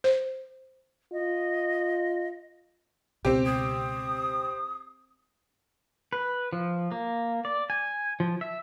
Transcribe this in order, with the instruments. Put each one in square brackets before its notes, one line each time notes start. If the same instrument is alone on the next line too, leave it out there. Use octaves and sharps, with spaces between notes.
[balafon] C5
[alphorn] F4 [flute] D#5
[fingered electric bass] C#2 B2 B3 [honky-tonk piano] C4 G4
[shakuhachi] D#6
[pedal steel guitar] B4
F3
A#3
D5
G#5
F3
E5